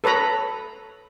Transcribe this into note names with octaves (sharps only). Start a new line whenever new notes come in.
A4 B4 C#5 A#5 B5